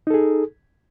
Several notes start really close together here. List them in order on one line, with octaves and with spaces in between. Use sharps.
D#4 A4 G#4